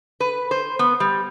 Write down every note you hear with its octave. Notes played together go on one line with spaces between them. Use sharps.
B4
C5
B3
G3